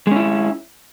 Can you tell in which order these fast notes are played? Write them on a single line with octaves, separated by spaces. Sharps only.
G#3 C#4 E4